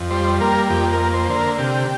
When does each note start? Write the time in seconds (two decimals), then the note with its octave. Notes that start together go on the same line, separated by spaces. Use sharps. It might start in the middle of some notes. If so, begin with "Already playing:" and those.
Already playing: F2
0.11 G3 C5
0.41 A#3 A#4
0.70 F2 G4
0.92 A#4
1.00 A#3
1.14 C5
1.26 D3 C5
1.36 A#4
1.58 C3 G4